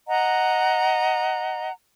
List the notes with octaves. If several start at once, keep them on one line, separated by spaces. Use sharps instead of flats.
D#5 F#5 A#5